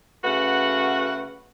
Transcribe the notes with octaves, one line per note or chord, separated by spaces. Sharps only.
C#3 A3 F#4 B4 F#5